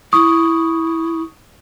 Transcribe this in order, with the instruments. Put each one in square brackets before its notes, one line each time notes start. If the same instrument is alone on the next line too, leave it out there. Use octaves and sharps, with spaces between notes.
[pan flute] E4 [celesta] C#6 D#6